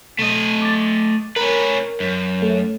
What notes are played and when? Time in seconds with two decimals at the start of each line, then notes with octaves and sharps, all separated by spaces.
0.19 B2 A3 D#5
0.62 D6 A6
1.36 C#4 A#4 B4
2.00 F#2
2.42 A3